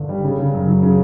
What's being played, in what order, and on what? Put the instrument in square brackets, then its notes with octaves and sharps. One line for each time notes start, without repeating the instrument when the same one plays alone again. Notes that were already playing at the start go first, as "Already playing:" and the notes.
Already playing: [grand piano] G1 D3
G3
C#3
C#3
F#2
F#3
C#3